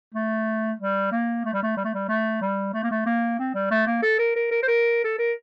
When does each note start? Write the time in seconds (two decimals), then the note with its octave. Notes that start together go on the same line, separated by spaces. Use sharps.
0.14 A3
0.80 G3
1.12 A#3
1.45 A3
1.53 G3
1.63 A3
1.77 G3
1.85 A3
1.94 G3
2.08 A3
2.41 G3
2.73 A3
2.83 A#3
2.91 A3
3.06 A#3
3.39 C4
3.54 G3
3.71 A3
3.86 A#3
4.02 A4
4.19 A#4
4.36 A#4
4.51 A#4
4.63 C5
4.68 A#4
5.04 A4
5.19 A#4